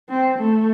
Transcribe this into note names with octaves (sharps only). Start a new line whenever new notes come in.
C4
A3